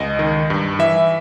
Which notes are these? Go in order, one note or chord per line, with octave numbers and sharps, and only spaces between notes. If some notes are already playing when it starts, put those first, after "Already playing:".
Already playing: C#2 D#5
D#3
G2
E3 E5